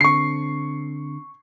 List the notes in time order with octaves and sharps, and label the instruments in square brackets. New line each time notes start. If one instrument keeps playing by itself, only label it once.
[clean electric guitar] D3 C4 [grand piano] C#6 C7